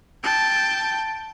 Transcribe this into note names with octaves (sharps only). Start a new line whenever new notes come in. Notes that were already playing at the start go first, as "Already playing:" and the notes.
G5 A5